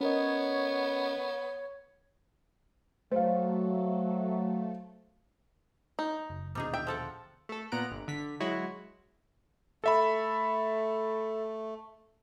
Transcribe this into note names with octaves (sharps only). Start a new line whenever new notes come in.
B3 C#4 A#4 C#5 D#5
F#3 A3 C5 F5
D#4
F#1
D#1 B2 D3 G3 D#4 G#4
E5 G5
F3 A4 F#5
A3 A4
A#2 B3 A#5 F#6 D7
G1
D3 B6
F#3 G#3 E4 F#4 C#5
A3 A4 E5 B5